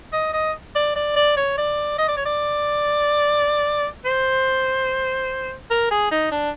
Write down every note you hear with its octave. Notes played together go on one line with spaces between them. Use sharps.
D#5
D#5
D5
D5
D5
C#5
D5
D#5
D5
C#5
D5
C5
A#4
G#4
D#4
D4